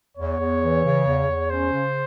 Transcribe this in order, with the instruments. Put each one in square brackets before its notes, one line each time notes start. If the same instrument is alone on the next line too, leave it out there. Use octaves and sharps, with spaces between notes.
[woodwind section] E2 [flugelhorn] C#5
[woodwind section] E2
E3
C#3
E2
E2
[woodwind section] C#4 [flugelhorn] C5
[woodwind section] C#3